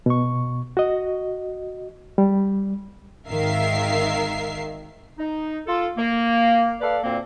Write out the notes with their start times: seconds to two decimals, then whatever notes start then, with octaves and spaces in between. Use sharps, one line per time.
0.06 B2 C#6
0.77 F#4 D#5
2.18 G3
3.29 G#1 D#3 A#4 E5 F5 C7
5.18 D#4
5.66 F4 A4
5.98 A#3
6.81 A4 B4 D5 F5
7.04 D2 A#2 A#3 C4